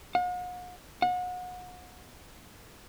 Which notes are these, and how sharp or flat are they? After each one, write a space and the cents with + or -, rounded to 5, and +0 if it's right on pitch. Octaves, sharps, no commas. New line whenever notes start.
F#5 -45
F#5 -35